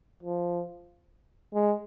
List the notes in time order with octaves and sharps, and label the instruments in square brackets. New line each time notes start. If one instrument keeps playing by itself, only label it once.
[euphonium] F3
G#3